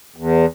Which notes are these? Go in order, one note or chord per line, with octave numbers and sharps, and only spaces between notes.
E2